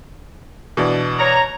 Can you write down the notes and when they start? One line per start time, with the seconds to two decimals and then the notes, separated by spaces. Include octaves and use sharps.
0.77 B2 E3 D4
1.18 C#5 A#5